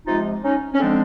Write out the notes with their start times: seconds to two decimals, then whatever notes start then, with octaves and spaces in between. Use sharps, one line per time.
0.07 C3 F3 G#3 D#4 F4
0.44 C#4 D#4
0.74 C#4
0.80 D3 F3 G#3 C4 D4